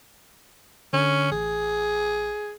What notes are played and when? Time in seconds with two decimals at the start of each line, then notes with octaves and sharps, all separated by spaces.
0.93 D3 C#4
1.32 A1 G#4